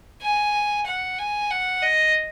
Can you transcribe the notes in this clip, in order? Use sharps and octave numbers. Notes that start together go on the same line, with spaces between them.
G#5
F#5
G#5
F#5
D#5